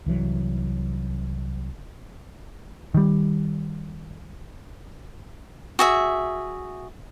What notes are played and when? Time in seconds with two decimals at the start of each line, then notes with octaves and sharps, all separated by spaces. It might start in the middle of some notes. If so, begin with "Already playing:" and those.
0.06 C2 E3 F#3
2.94 D#3 G3
5.79 F#4 G#4 E5